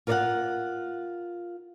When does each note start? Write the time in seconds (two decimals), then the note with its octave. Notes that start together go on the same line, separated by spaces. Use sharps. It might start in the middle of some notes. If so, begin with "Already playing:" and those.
0.07 F4 A#4 C#5 D5 F5 F#5